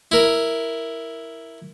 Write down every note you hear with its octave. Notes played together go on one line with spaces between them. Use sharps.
E4 A#4